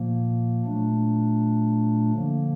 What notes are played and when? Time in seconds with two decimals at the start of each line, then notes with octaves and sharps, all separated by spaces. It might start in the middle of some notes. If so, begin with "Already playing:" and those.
Already playing: A#2 F3 A#3
0.66 A#2 F#3 A3 D4
2.12 D3 F3 A#3